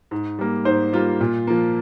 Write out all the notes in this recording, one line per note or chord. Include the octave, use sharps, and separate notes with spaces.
G#2
G3 A#3
G#2 C5
G3 A#3 F4
A#2
F3 A#3